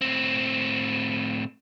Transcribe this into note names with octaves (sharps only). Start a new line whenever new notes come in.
A2 C4